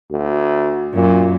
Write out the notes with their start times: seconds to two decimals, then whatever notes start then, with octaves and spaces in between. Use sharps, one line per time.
0.11 D2
0.93 F#2 A#2